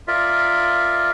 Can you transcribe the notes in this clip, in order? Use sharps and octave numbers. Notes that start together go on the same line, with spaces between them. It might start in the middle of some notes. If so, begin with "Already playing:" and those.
F4 A#4 D5 E5